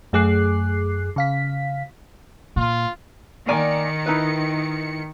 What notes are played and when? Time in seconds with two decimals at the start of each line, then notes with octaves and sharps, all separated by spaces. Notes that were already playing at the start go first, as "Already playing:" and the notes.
0.13 F#2 A3 G#4 D6 F#6 C7
1.16 C#3 F5 B6
2.56 A#2 F4
3.49 D#3 A#3 D5 G#5 C#7
4.06 D#4 E4 B4